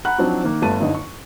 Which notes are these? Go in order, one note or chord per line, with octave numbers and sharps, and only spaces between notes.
F#5 A#5 B5 F#6
F3 F#3 C4 D4 D#4 F#4
D#3 A#3
G1 A3 B3 B4 A5 D#7
F#1 D#2 D3 D#5
C#6